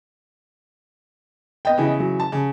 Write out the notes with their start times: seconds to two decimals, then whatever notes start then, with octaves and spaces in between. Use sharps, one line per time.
1.65 B3 D#5 G5
1.78 C#3 E3
2.00 F#3
2.20 A5
2.32 C#3